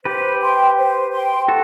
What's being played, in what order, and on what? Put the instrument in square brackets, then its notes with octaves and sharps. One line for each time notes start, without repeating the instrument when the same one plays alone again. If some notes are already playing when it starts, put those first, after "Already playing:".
[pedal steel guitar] G4 B4 [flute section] C5
[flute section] G5 C6
C5
G5 C6
[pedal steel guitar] F#4 A4